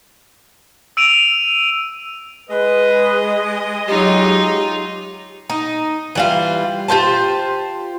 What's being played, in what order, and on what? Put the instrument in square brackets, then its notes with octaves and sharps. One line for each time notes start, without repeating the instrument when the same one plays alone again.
[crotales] E6 D7 D#7 F7
[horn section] G#3 D#5 [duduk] B4
[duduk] F#3 [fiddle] D#4 F4 [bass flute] G4
[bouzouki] D#4
E3 G3 F4
F4 G4 C5 A5